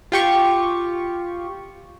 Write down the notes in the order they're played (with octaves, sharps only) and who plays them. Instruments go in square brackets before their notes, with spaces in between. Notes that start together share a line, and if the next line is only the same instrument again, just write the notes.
[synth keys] F4 G4 C#6